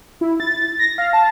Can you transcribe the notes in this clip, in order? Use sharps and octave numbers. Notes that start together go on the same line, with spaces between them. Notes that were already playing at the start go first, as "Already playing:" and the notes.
E4
A6
A#6
F5
A5